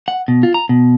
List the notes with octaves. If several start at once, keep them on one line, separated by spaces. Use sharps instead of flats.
F#5
B2
F4
A#5
B2